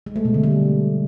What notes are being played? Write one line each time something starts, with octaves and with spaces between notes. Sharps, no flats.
G#3
A3
B2
D3
G3